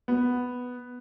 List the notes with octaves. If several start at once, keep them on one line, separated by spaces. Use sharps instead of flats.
B3